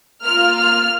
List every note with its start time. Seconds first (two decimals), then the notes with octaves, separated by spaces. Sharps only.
0.25 A#3 F4 F6
0.58 F6